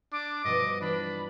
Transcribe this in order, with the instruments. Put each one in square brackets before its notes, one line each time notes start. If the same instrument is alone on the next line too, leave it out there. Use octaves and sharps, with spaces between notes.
[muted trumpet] D4 [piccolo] D6
[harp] G2 B2 F3 [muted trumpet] D#5
[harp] E3 [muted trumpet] D4 [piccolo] B5